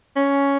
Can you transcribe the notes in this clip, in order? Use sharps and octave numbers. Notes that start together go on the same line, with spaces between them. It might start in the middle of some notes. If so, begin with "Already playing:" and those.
C#4